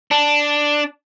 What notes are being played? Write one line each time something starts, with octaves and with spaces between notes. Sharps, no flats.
D4